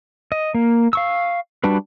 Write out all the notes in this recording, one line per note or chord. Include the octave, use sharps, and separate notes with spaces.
D#5
A#3
F5 C#6 E6
G3 D4 F#4 B4